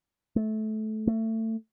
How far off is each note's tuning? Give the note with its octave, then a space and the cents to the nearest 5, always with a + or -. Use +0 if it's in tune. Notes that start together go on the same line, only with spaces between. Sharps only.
A3 -20
A3 +25